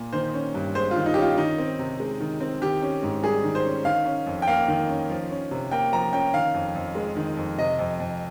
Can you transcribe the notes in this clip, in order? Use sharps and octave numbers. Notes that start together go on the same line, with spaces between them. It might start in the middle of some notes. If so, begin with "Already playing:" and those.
Already playing: A#2
D#3 C5
C#4
G2
G#3 C5
F4
D#3
D#4
C#4 G4
F4
D#3 D#4
C4
C3
G#3
D#3
C4
D#3 G4
C#4
G#2
G3 G#4
D#3
C5
C#4
D#3 F5
C#4
F2
G5
A#3 F5
D#3
C#4
F3
C#4
C3
A#3 G5
F3 A#5
C#4 G5
D#3 F5
F2
F2
G#3
D#3
F2
C3 D#5
F2
F2